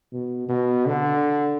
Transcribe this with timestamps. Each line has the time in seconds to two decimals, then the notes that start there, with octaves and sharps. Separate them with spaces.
0.12 B2
0.49 B2
0.86 D3